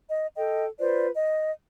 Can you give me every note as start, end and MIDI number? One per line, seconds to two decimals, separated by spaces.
0.09 0.27 75
0.36 0.66 69
0.36 0.66 75
0.36 0.66 79
0.80 1.07 65
0.80 1.07 71
0.80 1.07 72
0.80 1.07 74
1.15 1.51 75